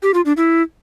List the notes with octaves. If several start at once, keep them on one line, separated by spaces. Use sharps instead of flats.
G4
F4
D4
E4